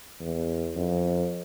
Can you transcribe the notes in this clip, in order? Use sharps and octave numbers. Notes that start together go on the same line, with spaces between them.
E2
F2